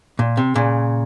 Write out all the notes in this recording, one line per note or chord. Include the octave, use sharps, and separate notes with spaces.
A#2
C3
A#2 C#3